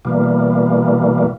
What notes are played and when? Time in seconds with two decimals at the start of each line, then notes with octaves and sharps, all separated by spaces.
0.05 B2 E3 G3 A#3